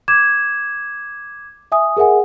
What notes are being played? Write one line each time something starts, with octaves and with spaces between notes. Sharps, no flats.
D6 G#6 E7
E5 G#5 D#6
G#4 A#4 E5 F#5 G#5